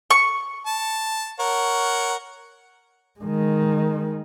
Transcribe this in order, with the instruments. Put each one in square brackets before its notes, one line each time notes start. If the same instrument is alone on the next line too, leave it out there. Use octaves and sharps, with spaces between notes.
[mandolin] C#6
[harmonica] A5
A#4 C#5 F#5
[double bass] D#3 G#3